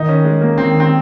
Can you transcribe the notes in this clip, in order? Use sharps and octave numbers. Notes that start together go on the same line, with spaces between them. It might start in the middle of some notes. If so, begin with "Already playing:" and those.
Already playing: D#3 D#4
C#4
G#3
A#3
D#3 C4
C4